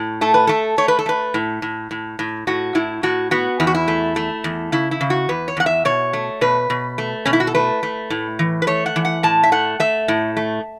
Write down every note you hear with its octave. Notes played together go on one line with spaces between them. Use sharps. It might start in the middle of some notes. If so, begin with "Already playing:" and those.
Already playing: A2
A3 A4
B4
A3 A4
A3 C#5
B4
A4
A3 B4
A2
A2
A2
A2
A2 F#4
A2 E4
A2 F#4
B3 F#4
E2 E4
F#4
E4
A3
A3
E2
C#3 E4
E4
C#3
F#4
E2 B4
C#5
E2 F#5
E5
B2 C#5
A3
B2 B4
B2
A3
B2 C#4
E4
F#4
A4
A3 B4
A3
A2
E3
B4
A3 C#5
F#5
E3
F#5
A2 A5
E5
A3 F#5
A3 E5
A2
A3